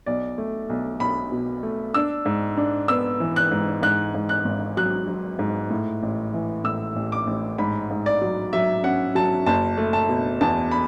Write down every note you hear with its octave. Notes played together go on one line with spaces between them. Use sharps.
B1 D5
A3
B1
B1 B5
B2
A3
D4 E6
G#2
D4
B3 E6
E3
F#6
G#2
G#2 F#6
G#2
F#6
G#1
F#3 F#6
F#3
G#2
A2
A1
E3
A2 E6
A1
D6
A1
G#2 B5
G#2
D5
F#3
F#3 E5
C#4 F#5
F#3 A5
F#1 A5
A3
A5
B2
E2 A5
B5